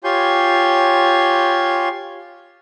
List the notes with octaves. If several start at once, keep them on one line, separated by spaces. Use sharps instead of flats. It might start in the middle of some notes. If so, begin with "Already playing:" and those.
F4 G4 C#5 G#5 C6 G6